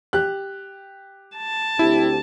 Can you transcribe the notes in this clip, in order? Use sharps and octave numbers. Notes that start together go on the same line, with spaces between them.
G4 F#6
A5
D2 C4 E4 G4